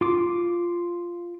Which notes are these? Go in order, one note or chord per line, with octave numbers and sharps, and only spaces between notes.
F4 D6